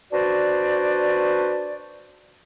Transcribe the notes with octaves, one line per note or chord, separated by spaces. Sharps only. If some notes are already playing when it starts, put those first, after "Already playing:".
D4 F#4 B4 C5 D5